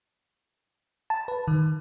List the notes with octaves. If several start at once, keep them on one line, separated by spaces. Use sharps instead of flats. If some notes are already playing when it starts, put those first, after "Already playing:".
A5
B4
D#3